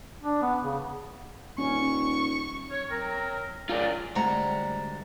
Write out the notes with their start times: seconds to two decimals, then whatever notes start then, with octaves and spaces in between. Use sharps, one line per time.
0.22 D4
0.42 B3
0.64 C#3
1.58 D#1 C#4 C#6
2.70 C#5
2.90 F#3 C4 A#4
3.69 F#3 F4 G#4 A#4 D5
4.15 D2 G3 G#3 C4 F#5 A#5